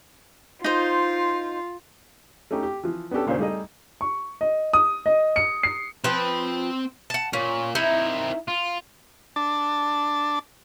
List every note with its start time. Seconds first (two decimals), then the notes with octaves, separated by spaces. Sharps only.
0.64 D#4 F4 C5
2.51 A3 C#4 D#4 G4
2.63 G4
2.83 E3 F3
3.11 B3 C#4 D4 G4 A4
3.26 D#2 A#2 C#3 D4 C5
3.39 G3 A3 D#4 G#4 D#5
4.01 C#6
4.41 D#5
4.73 D#6
5.06 D#5
5.36 C#7
5.63 C7
6.04 F3 C4 B4 G5
7.10 F#5 A5
7.33 A#2 C#4
7.75 C4 D#4 E4 A#4
8.48 F4
9.36 D4 A5